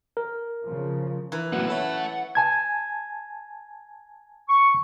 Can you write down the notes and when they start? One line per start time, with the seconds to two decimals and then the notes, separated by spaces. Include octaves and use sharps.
0.17 A#4
0.64 C#3 F3
1.32 E3 A#4
1.53 F#2 A2 F#3 A#3 B3 F#5
1.68 C#4 A4 B4 C#5 E5
2.35 G#5 A5 G#6
4.49 C#6